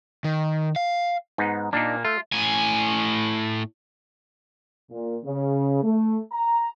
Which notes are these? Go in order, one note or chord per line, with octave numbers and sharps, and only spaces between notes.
D#3
F5
G#2 B3 D#4
A#2 A#3 D4 D#4
A3 F4
A2 G#5
A#2
C#3
A3
A#5